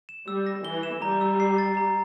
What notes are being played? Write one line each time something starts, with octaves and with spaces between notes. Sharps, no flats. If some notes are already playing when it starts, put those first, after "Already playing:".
E7
G3 E6
A#6
E3 G7
E7
G3 A#5
E6
C7
A6
A#5